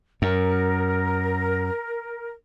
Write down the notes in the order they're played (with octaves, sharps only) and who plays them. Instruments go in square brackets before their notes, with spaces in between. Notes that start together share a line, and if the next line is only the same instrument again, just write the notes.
[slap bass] F#2 [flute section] A#4